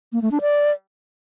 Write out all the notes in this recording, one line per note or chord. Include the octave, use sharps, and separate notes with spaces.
A#3
A3
D4
D5